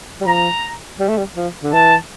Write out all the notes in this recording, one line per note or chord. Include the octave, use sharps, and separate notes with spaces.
G3
F3 A#5
G3
A3
G3
F3
D3
E3 A5